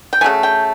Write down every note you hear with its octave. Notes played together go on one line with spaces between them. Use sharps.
G5
C#3 F#3 A3 G#5
G5